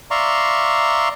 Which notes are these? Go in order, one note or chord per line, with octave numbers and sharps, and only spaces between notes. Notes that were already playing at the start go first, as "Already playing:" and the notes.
D5 E5 F5 A#5 C6 C#6